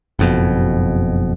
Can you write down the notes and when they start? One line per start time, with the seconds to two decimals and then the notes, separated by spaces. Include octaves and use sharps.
0.19 F#1 F2 B2